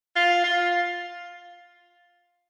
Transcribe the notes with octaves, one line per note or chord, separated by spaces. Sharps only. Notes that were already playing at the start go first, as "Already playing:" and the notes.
F4
F4